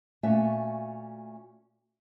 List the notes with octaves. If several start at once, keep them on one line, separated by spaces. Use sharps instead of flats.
A#2 A3 C#4 F#4 E5